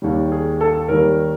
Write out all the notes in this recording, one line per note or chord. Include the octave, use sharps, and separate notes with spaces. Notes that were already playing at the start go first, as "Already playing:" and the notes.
D#2 D#3 G3
G#4
A4
D#2 D#3 G3 A#4